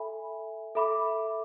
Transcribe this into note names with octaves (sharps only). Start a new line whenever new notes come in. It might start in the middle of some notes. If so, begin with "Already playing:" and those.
Already playing: A4 E5 G#5 B5
A4 E5 B5 D6